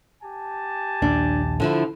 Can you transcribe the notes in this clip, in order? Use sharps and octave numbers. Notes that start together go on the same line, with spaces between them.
G4 G#5 A5
A#1 D#2 D4
D3 F3 E4